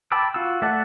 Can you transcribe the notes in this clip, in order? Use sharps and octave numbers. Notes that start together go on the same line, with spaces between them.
G5 A5 B5 D6 E6
F4 F#4 E6
A3 D5 E5 F#5 A5